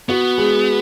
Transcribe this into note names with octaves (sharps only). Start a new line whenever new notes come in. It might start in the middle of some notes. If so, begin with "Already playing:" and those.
B3 F#4
G#3